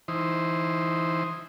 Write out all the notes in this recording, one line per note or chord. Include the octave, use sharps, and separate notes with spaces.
E3 D#4 C5